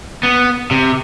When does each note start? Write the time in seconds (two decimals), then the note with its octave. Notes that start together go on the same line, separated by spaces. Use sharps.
0.23 B3
0.71 C3